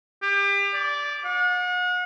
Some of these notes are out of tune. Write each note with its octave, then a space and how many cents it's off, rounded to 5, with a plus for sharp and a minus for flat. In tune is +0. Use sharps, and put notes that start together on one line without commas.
G4 +30
D5 -15
F#5 -40